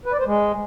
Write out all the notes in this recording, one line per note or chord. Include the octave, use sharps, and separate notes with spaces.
B4
D5
C5
G#3